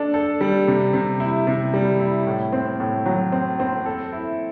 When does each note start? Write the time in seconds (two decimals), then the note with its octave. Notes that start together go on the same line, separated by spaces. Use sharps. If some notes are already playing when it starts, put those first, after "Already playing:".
Already playing: D4 A4
0.14 A4
0.41 G3
0.67 C3
0.93 C3
1.20 E4
1.47 C3
1.74 G3
2.00 E4
2.27 A2
2.53 C4
2.80 A2
3.06 F#3
3.32 C4
3.60 C4
3.86 A4
4.12 E4